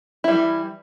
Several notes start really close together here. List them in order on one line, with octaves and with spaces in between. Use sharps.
E4 G3 E3